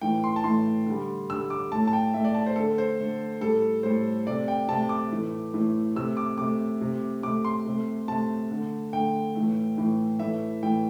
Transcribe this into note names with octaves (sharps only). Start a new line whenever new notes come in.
A2 E3 A3 G5
C6
A5
A2 E3 A3 C6
D3 G3
D3 G3 E6
D6
A2 A3 A5
A5
G5
A2 A3 E5
D5
A5
C5
D3 A3 A4
C5
D3 A3
A2 G3 A4
A2 G3 C5
C3 A3 D5
G5
C3 A3 A5
D6
A2 E3 A3
A2 E3 A3
C3 A3 E6
D6
C3 A3 D6
C3 A3
C3 A3 D6
C6
C3 A3
C3 A3 A5
D3 A3
D3 A3 G5
A2 E3 A3
A2 E3 A3
A2 E3 A3 E5
A2 E3 A3 G5